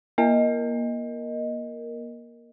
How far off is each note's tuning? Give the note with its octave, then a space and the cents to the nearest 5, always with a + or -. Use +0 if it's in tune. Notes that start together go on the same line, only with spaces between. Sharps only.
A#3 +30 A#4 +0 D#5 +0